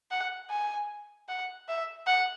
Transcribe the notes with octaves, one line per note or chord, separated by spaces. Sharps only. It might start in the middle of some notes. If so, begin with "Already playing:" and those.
F#5
G#5
F#5
E5
F#5